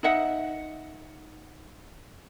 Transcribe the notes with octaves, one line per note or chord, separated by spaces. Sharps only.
D#4 D#5 E5 F#5